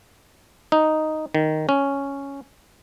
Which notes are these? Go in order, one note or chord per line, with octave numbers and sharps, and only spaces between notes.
D#4
D#3
C#4